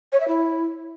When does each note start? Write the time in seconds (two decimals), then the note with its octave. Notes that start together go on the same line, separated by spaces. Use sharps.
0.12 C#5
0.20 E5
0.28 E4